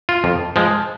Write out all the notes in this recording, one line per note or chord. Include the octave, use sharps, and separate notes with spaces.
F4
F2
F3 G#3